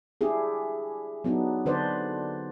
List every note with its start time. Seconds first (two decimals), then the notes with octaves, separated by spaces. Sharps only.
0.21 D4 E4 G4 G#4
1.24 F#3 B3 D4 D#4
1.66 D3 D4 B4 C5 D5